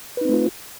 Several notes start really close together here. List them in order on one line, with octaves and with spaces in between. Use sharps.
B4 D#4 C4 A3 F4